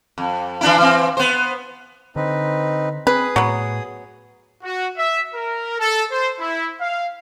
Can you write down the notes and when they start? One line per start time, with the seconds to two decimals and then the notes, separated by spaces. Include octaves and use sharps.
0.18 F2
0.61 E3 D4 E4
0.78 E3 C4
1.17 B3 C5
2.16 D3 C4 D#4 B4
3.07 C4 G#4 B4 D#6
3.36 A2 F#3 B3
4.64 F#4
4.97 E5
5.34 A#4
5.79 A4
6.11 C5
6.40 E4
6.81 F5